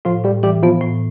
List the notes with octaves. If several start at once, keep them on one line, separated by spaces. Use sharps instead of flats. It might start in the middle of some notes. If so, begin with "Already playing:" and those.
A2 F3 F4
A2 G3 G4
E3 G3 G4
F3 B3 F4
A2